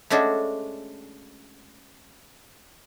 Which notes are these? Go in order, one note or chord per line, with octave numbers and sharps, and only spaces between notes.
G#3 A3 C#4 D4 F#4